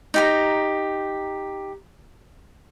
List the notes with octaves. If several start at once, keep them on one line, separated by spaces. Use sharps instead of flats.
D#4 G4 A#5